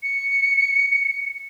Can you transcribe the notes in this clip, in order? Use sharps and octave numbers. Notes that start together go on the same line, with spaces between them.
C#7